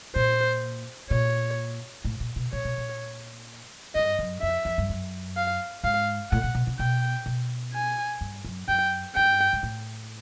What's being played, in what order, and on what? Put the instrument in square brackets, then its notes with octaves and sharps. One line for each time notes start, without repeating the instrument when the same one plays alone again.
[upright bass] A#2 [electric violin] C5
[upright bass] A#2 [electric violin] C#5
[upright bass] A2
A#2
B2
[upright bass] A#2 [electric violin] C#5
[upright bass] B2
A#2
[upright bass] G2 [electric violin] D#5
[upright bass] F#2
[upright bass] F2 [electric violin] E5
[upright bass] F2
G2
F#2
[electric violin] F5
[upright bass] G#2 [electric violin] F5
[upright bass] A2 [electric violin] F#5
[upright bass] A#2
B2
C3
[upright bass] B2 [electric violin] G5
[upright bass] B2
[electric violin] G#5
[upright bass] G2
F#2
[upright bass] F#2 [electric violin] G5
[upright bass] G2 [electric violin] G5
[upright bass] G#2
A2